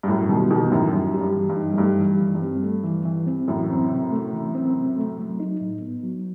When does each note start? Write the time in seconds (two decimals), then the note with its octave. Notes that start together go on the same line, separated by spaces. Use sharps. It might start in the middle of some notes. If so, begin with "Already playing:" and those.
0.03 G2
0.08 F#2 A2 G3
0.29 B2 D#3 G4
0.50 B2 D#3 E3
0.71 F#2 A2 D#4
0.93 F#2 G3
1.14 G4
1.21 G2
1.36 E3
1.49 G2
1.57 D#4
1.73 F#2
1.78 G2 A3
1.99 E3
2.06 G2
2.21 E3
2.35 G2
2.42 C4
2.63 A3
2.84 E3
3.05 E3
3.27 C4
3.48 F#2 A2 E3
3.70 C4
3.90 C3
4.12 A3
4.33 E3
4.55 C4
4.75 C3
4.97 A3
5.18 F#3
5.40 D#4
5.61 A2
5.81 B3
6.03 F#3